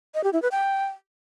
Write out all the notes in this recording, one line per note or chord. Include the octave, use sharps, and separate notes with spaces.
D#5
G4
E4
B4
G5